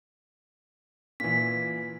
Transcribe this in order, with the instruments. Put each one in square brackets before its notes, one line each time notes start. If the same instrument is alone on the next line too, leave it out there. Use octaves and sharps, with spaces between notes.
[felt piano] A#2 E3 [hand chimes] B6